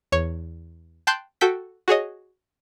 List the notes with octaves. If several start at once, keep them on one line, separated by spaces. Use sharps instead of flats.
E2 C#5
G5 A5 C6 F#6 G6
F#4 A4 G5 B6
F#4 G#4 C#5 D#5